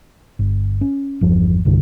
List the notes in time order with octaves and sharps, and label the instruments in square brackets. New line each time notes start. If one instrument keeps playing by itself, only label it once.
[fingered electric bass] G1
C#4
G1 E2 F3
C2 G2 D3